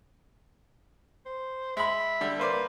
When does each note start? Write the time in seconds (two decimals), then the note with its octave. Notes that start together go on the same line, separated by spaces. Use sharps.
1.26 C5
1.77 G#3 E5 B5
2.21 D3 G3
2.39 A#3 B4 C5 D5